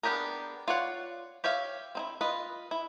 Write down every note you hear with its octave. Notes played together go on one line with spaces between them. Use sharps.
B3 D4 G4 G#4 A#4
F4 C#5 D5 F#5
G4 C#5 E5 F5
C4 D#4 E4
F4 B4 D#5
E4